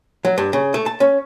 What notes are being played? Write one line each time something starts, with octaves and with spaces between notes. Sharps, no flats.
F#3
G2
C#3
A3
A5
C#4